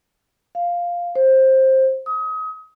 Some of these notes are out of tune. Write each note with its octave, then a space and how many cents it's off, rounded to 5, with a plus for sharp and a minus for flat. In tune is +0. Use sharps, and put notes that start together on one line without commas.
F5 +0
C5 +15
D#6 +30